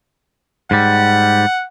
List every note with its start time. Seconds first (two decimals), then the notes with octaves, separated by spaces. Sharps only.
0.71 G#2 G3 F#5